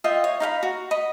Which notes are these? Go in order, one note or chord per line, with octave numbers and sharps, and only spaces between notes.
F4 D#5 E5 G5
C#5
D#4 F5 F#5 B5
F#4
D#5 B5